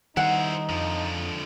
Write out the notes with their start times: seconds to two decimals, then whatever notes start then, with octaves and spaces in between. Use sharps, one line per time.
0.17 D#3 G3 D#4 E4 C5 F#5
0.69 F2 D3 F3